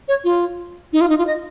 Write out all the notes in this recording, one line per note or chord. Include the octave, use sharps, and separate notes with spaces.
C#5
F4
D#4
F4
D#4
F4
D#5